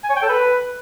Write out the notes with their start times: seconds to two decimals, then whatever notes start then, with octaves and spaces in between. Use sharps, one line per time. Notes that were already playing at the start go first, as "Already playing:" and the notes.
0.03 G#5
0.10 C#5
0.16 G5
0.23 A4
0.29 B4